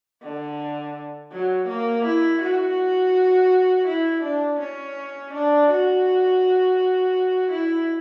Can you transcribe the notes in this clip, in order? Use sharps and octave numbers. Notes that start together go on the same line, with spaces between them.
D3
F#3
A#3
E4
F#4
E4
D4
C#4
D4
F#4
E4